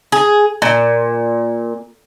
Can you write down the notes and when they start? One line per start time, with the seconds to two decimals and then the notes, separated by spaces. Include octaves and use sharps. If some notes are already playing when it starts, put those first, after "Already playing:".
0.12 G#4
0.62 A#2